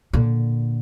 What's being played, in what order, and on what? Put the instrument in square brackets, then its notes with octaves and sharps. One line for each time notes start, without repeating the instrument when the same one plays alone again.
[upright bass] A#2 D3